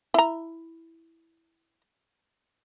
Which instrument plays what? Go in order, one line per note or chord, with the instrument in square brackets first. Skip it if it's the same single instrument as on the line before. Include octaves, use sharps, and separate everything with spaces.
[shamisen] E4 A#5